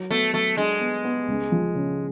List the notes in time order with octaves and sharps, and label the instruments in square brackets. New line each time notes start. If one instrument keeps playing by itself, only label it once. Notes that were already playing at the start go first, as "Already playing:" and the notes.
Already playing: [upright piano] F#3
[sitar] A3 [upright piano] B3
[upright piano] F#3 [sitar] A3
[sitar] G#3 [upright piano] D4
[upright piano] B3
B3
C#2
F3
C#3